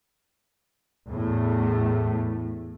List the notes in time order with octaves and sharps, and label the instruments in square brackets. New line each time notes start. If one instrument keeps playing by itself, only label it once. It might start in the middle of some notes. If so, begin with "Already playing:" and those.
[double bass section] E2 A2 A3